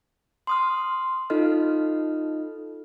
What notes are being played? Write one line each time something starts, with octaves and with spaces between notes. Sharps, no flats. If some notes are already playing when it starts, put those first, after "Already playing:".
C6 D#6 F6
D#4 F4 A4 D#5 F6